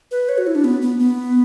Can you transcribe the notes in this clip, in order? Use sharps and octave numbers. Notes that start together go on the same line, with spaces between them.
B4
C#5
F#4
E4
D4
B3
B3
B3